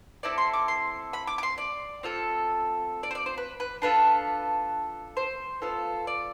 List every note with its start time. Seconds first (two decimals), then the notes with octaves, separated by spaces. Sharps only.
0.23 C4 E4 A4 D5
0.38 C6
0.53 D6
0.68 C6
1.13 B5
1.27 D6
1.38 D6
1.43 C6
1.58 D5
2.03 C4 F4 A4
3.03 D5
3.11 C5
3.15 D5
3.26 C5
3.38 B4
3.60 B4
3.82 D4 F4 A4 B4
5.17 C5
5.62 B3 F4 A4
6.07 D5